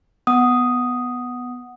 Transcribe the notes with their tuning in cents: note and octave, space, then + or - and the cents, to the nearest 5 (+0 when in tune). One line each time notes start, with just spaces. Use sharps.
B3 +0 F#5 +0 D#6 +0